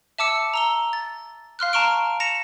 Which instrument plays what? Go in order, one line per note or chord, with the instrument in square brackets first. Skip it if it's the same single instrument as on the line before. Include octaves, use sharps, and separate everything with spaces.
[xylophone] E5 A5 D6 E6 C#7
A#5 E6 G7
A6
F5 C6 F6 F#6
A5 A#5 C6 C#6 F6 D7
A#6 C#7 E7 F7